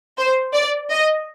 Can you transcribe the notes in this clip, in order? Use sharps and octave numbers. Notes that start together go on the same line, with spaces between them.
C5
D5
D#5